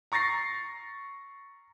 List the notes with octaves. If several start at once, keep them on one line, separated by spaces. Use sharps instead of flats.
A#5 C#6 A6 A#6 C7